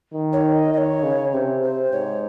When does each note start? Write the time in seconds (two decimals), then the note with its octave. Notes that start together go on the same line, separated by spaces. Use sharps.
0.13 D#3
0.33 C#5
0.53 D#5
0.73 D#3 C#5 D#5
1.03 C#3
1.33 C3 C5
1.63 C5
1.92 G#2 C#5